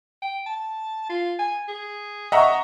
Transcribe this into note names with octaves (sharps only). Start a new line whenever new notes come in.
G5
A5
F4
G#5
G#4
D#5 E5 F#5 A#5 C#6